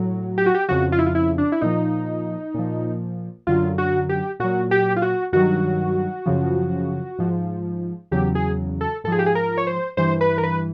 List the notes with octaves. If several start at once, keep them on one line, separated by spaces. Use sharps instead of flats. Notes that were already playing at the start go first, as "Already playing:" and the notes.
Already playing: A2 F#3
G4
F#4
G4
F2 C#3 F3 F#4
F4
E4
F4
E4
D4
E4
A#2 F3 D#4
A#2 F3
F#2 D3 F#3 F4
F#4
G4
A#2 F#3 F#4
G4
F4
F#4
G2 D#3 F#3 F#4
F#2 C#3 F3
G#2 F3
E2 C#3 F#3 G4
G#4
A4
G#2 F3 G#4 A4
G4
G#4
A#4
C#5
C5
G2 E3 C5
B4
A#4
B4